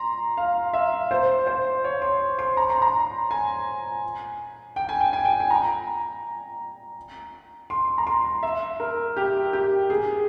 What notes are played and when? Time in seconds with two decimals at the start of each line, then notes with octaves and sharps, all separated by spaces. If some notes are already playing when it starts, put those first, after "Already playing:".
Already playing: A#5 C6
0.37 F5
0.73 E5
1.11 C5
1.47 C5
1.84 C#5
2.02 C6
2.39 C6
2.57 A#5
2.70 C6
2.82 A#5
3.31 G#5
4.76 G5
4.89 G#5
5.00 G5
5.13 G#5
5.25 G5
5.40 G#5
5.50 A#5
7.70 C6
7.98 A#5
8.07 C6
8.43 E5
8.80 A#4
9.17 G4
9.53 G4
9.90 G#4